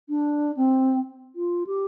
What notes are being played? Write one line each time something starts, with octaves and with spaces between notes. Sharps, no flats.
D4
C4
F4
G4